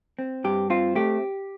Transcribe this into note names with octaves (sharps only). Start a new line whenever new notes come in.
C4
G2 G4
C4 F4
A3 G4